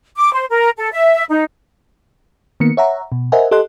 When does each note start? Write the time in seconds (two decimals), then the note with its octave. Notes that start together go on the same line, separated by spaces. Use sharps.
0.16 D6
0.33 C5
0.50 A#4
0.77 A4
0.93 E5
1.29 D#4
2.60 D#3 A#3 B3 C#7
2.77 C#5 E5 F#5 A#5
3.12 B2
3.32 A#4 C5 D#5 E5 F#5 G#5
3.51 G4 A4 D#5 C6 F#6